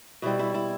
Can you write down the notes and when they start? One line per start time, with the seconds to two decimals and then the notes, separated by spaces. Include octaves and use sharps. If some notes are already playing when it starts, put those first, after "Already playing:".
0.22 B2 G3 C4 E4
0.39 E4
0.54 E4